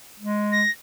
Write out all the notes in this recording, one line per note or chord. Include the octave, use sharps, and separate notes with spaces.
G#3
A#6